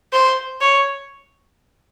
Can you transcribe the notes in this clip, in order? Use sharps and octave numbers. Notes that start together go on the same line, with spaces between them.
C5
C#5